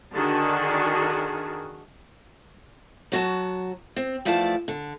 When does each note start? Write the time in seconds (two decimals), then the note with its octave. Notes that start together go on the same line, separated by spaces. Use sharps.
0.12 D3 D#3 D4 F#4 G#4
3.12 F#3 F#4 A5
3.96 C4
4.25 E2 F3 A3 E4 D5 A5
4.68 D3